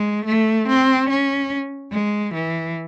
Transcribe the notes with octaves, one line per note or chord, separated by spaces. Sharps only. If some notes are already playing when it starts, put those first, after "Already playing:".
Already playing: G#3
A3
C4
C#4
G#3
E3